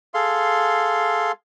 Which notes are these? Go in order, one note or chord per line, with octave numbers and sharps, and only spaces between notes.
G#4 A4 F5 C6